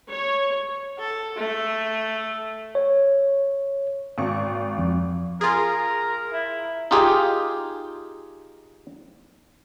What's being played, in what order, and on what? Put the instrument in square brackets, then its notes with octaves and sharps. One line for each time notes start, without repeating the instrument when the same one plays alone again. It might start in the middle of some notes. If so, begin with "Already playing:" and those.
[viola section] C#5
[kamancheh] A4
A3
[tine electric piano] C#5
[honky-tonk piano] G#1 C#6
[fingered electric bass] F2
[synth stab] F4 G#4 [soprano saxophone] A#4
[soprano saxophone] E4
[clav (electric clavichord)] D#4 F4 G4 G#4